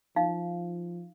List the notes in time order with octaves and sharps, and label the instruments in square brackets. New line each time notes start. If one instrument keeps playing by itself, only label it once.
[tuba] F3 [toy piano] D#4 F5